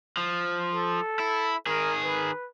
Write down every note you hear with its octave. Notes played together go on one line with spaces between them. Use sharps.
F3
A4
E4
D#3 G#4 A#4
B4